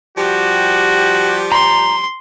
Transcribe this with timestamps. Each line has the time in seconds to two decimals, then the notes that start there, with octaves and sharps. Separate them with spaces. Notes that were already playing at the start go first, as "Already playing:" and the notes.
0.18 F3 G3 F#4 G4
1.52 A#5 C6